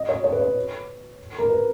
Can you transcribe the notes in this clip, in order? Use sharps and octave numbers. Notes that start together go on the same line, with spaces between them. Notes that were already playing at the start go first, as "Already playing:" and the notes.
Already playing: D#5
C#5
C#5
B4
C#5
A#4
B4